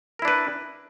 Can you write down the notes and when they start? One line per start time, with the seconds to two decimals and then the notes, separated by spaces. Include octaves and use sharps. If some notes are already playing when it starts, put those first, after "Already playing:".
0.19 A#4
0.22 E4
0.25 D4
0.28 B4